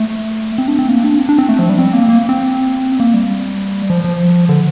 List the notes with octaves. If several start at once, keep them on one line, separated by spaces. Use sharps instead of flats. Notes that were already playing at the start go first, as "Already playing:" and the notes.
Already playing: A3
C4
D4
C4
A#3
D4
C4
D4
C4
A3
F3
G3
C4
A#3
A#3
C4
A#3
G3
F3
F3
D3